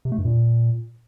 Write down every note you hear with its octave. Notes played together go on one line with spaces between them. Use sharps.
C3
A3
G2
A#2